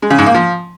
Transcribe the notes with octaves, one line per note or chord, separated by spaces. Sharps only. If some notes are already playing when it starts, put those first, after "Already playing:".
G#3
C#3
G#2
A#3
F3